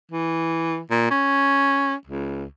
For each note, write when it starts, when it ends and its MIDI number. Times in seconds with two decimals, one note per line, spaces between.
0.11 0.80 52
0.90 1.09 46
1.11 1.95 61
2.07 2.45 37